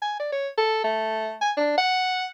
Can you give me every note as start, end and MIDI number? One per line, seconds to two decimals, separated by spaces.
0.02 0.17 80
0.19 0.29 74
0.32 0.48 73
0.58 0.82 69
0.84 1.35 57
1.41 1.52 80
1.57 1.78 62
1.78 2.26 78